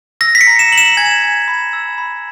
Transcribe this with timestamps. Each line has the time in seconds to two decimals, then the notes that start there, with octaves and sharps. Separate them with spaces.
0.21 E6 A#6
0.35 B6
0.41 C#7
0.47 A#5
0.59 E7
0.71 A#5 F#7
0.78 E7
0.97 G#5 G#6
1.23 G#5
1.48 B5
1.73 E6
1.98 B5